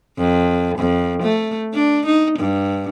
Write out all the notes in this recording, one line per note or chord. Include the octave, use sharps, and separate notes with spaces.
F2
F2
A3
D4
D#4
G2